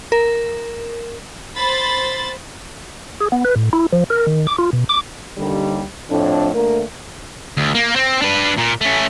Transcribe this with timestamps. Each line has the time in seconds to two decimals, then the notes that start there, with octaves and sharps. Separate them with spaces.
0.12 A#4
1.56 C5 B5 A6
3.21 G#4
3.32 B3
3.45 B4
3.56 A2
3.73 E4
3.93 F3
4.10 A#4
4.27 D#3
4.47 D6
4.58 F4
4.73 B2
4.89 D6
5.38 D#2 D3 G3
6.10 F2 A2 D4
6.54 D2 A3 A#3 D4 A#4
7.57 D2
7.75 A#3
7.96 C4
8.22 D4 B4
8.59 A#2
8.81 A3 C#4